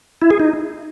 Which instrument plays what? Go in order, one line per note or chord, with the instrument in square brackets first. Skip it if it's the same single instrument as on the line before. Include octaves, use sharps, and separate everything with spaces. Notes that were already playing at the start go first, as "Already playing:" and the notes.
[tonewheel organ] E4
G#4
D#4